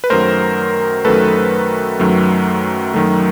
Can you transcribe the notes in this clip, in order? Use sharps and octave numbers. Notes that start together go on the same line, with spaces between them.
B4
F#2 D#3 F#3 A3 A#4 C5
F#2 D#3 F#3 A3 A4 B4
F#2 D#3 F#3 A3
F#2 D#3 F#3 A3